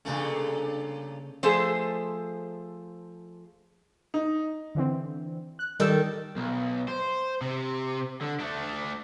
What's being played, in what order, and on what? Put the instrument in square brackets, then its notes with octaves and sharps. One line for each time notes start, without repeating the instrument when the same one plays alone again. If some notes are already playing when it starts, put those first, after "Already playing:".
[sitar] G2 A#2 A3 [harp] C#3 A#3 C#4
[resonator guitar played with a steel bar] F3 A3 G#4 A4 C5
[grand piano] D#4
[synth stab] D3 E3 C4
F#6
[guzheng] D#3 A4 [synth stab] G3 E6
[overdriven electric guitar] B1
C5
C3
D3
A3 D4